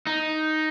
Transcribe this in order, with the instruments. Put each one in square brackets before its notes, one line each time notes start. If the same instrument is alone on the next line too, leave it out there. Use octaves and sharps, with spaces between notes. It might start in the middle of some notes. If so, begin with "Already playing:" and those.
[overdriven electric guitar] D#4